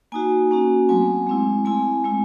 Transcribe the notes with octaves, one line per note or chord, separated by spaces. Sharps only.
A#3 D#4 F#4 G#5
A#3 C#4 F#4
F#3 A3 C4 G#5
G#3 C4 E4
A3 C4 E4 G#5
G#3 C4 E4